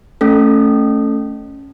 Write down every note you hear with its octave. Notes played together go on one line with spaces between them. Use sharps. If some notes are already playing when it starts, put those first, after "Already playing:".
A3 C#4 A4